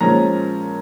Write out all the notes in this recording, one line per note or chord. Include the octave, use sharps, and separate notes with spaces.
A#2 F3 G#3 C#4 A#5